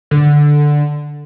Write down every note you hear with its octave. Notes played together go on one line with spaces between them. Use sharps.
D3